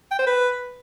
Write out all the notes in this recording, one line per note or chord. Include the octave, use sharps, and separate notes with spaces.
G5
C5
B4